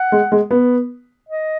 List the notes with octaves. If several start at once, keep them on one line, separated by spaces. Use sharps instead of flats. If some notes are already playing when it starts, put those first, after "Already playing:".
Already playing: F#5
G#3
G#3
B3
D#5